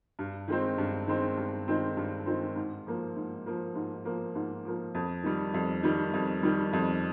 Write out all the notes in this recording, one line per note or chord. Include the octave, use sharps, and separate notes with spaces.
G2
D#3 G#3 C4
G2
D#3 G#3 C4
G2
D#3 G#3 C4
G2
D#3 G#3 C4
G#2
F3 A#3
G#2
F3 A#3
G#2
F3 A#3
G#2
F3 A#3
F2
D#3 G3
F2
D#3 G3
F2
D#3 G3
F2